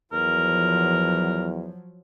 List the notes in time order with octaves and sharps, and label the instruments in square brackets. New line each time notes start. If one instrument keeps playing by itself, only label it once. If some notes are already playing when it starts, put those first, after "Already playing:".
[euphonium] E2 [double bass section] F3 F#3 [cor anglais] A#4